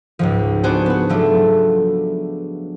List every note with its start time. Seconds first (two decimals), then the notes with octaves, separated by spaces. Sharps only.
0.19 C#2 G#2 F3
0.63 B3 D4 F#4 G#4 C5
0.86 B3 F#4
1.09 F3 F#3 A3 D4